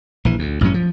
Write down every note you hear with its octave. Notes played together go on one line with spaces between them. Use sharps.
A#1 E3
D2
A1 F#2 F#3 C#4
F3